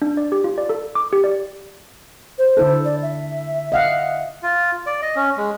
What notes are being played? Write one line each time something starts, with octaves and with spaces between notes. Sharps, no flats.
D4
D5
G4
F4
D5
A4
D6
G4
D5
C5
D3 E4 A4
D5
E5
D#5 F5 F#5
F4
D5
D#5
C#4
G#3